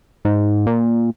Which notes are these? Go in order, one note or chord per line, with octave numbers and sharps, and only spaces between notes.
G#2
A#2